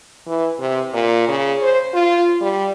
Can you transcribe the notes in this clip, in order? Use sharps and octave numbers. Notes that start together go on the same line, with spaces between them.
E3
C3
A#2
C#3
C5
F4
G3